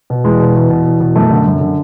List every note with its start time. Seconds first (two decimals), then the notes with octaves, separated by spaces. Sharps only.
0.10 B2
0.24 E2 G#3
0.40 B2
0.55 E2
0.70 B2
0.86 E2
1.00 B2
1.15 F#2 A3
1.31 D3
1.47 F#2
1.61 D3